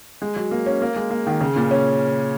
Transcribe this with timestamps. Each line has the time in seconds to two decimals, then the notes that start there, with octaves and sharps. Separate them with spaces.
0.22 G#3
0.36 F#3
0.51 A#3
0.66 C#4
0.82 A#3
0.96 G#3
1.11 A#3
1.27 D#3
1.41 C#3
1.56 A#2
1.71 C#4